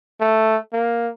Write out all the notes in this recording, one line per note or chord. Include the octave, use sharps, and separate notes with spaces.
A3
A#3